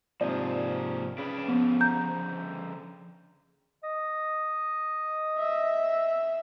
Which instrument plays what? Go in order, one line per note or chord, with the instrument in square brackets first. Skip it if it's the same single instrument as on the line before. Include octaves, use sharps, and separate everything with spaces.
[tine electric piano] G#2 C3 F3 [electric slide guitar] A#3 D#4 G#4 [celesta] D5
[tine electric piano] C#3 [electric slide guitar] D4 B4
[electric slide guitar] D3 F3 [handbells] B3
[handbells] A#5 [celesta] G6
[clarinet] D#5
[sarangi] E5